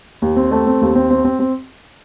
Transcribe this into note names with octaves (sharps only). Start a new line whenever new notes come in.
D#2
C4
A3
C4
D#2
C4
C4
C4
C4